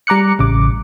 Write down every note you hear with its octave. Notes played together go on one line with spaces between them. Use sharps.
G3 A#5 D6 F#6 C#7
A1 C#3 D6